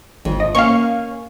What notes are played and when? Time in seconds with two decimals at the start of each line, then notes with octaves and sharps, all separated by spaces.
0.25 G#1 F2
0.40 D#5
0.55 A#3 C#4 F5 C#6